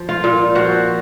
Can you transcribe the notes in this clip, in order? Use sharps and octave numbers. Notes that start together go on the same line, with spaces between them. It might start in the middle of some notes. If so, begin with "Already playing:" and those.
Already playing: F3
F4
A#2
F3 F#4